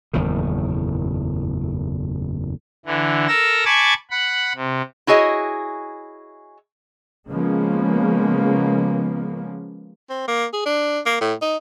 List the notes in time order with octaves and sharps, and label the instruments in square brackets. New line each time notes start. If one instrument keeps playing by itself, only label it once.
[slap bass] F#1 E2 A2 D#3
[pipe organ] D3 E3
A4 A#4 E6 A#6
G#5 A5 B5 C#6 D6 G#6
F#5 B5
C3
[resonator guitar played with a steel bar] E4 F#4 G#4 C#5 D#5
[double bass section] C#3 F3 G#3 A#3 B3 C#4
[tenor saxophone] C4
A#3
G#4
D4
A#3
A2
D#4